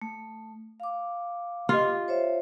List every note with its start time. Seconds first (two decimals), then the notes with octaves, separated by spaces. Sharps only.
0.02 A3
0.80 F5 D6
1.69 F4 G4 D#5
2.08 C5 C#5 E5